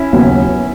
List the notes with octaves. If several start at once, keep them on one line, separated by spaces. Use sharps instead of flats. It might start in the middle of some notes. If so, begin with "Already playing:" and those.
Already playing: C#4 E4
D#2 C#3 F#3 B3